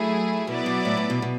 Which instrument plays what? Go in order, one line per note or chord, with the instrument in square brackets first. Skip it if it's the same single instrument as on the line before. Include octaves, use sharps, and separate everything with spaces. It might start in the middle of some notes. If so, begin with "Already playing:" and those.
Already playing: [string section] F#3 A3 E4 G#4
[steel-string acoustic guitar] B2 [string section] F#3 B3 E4 B4 D5
[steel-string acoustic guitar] B2
A2
A2
B2
B2